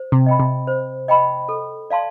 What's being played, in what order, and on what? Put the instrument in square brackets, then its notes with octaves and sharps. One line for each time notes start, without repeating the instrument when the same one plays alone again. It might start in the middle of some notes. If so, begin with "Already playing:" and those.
Already playing: [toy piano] C5
[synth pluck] C3
[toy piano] D#5 G5 B5
[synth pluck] C3
[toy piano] C5
D#5 G5 B5
A4
D5 F5 A5 C6